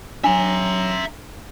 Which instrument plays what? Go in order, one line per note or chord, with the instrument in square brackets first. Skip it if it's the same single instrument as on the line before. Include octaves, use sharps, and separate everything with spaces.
[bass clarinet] F#3 [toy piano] D4 [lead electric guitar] E5 A#5